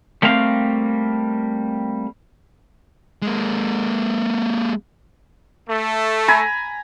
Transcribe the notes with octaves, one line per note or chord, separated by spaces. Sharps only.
G3 A3 A#3 C4 F5
G#3 A#3
A3
G#5 A#5 B5